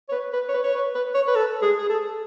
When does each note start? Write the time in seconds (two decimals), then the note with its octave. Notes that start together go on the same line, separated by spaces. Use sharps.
0.09 C#5
0.12 B4
0.33 B4
0.49 C#5
0.53 B4
0.64 C#5
0.74 B4
0.95 B4
1.14 C#5
1.27 B4
1.35 A4
1.62 G#4
1.78 G#4
1.89 A4